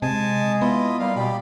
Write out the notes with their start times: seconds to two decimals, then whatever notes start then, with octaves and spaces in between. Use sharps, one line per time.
0.02 C3 G#3 G#5 A5
0.61 B3 E4 F4 D#5
0.99 G3 A#3 F5
1.16 B2 G4 D5 B5